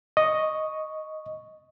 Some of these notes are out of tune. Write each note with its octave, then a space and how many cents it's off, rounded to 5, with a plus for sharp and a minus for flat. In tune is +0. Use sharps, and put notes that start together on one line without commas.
D#5 +0 C#6 +0